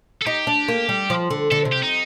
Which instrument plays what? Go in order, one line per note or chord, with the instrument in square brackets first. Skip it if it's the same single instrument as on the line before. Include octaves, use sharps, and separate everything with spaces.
[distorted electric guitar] A4
[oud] D#4 [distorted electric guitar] G4
[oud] D4
A#3
G3
F3
D3
[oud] D3 [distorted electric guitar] A4
[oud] C3
[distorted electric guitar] G4
D#4